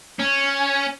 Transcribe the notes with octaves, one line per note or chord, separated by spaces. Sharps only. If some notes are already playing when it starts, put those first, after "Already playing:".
C#4